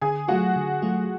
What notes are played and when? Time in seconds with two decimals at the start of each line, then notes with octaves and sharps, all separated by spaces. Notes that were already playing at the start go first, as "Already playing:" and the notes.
0.02 D3 G#4 G#5
0.28 F#3 A3 F4 F#4 F#5
0.56 D3
0.82 F#3 A3 F4